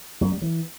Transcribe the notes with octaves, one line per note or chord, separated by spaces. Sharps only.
F#2
G3
E3